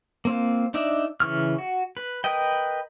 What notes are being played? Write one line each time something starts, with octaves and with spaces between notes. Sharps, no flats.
A#3 C4 F4
D4 D#4 D5 E5
C#3 E3 C#6 F6
F#4
B4
A#4 B4 D#5 G5